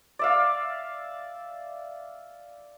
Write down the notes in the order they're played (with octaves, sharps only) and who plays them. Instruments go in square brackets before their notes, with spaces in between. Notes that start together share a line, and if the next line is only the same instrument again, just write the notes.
[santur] D5 E5 F5